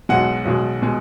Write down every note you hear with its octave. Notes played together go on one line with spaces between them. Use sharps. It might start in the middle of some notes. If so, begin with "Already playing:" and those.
B1 B2 G#3 F#5
B1 B2 G#3
B2 G#3